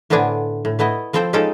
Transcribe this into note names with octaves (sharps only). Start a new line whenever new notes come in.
A2 D3 B3 C4 D4 G#5
A2
A3 B3 E4 D#5
F3 C4 A4 C5 G5
G#3 C#4 D#4 F4 A4 G5